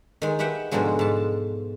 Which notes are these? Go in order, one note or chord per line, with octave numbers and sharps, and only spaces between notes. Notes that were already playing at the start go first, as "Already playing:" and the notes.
D#3 G#3
G4 B4 E5 F#5 G5
G#2 B2 D3 F3 F#3 G#3
G#2 A5